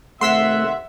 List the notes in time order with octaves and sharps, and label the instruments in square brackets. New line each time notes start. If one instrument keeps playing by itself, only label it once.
[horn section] C3 D#3 F#5 [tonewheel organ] A3 [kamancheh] E5 [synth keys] C6 E6 B6